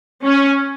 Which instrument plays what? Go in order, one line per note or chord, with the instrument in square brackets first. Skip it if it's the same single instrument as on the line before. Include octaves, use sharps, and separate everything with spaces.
[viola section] C#4